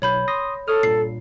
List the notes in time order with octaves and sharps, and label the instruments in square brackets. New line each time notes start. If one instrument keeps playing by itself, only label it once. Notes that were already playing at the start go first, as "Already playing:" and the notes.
[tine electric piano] B1 [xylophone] C#5 B5 G6
[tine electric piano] C6 D#6 A#6
[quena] A4 [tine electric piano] C#5 D#6 F6
[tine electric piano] G2 A#2 [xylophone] C7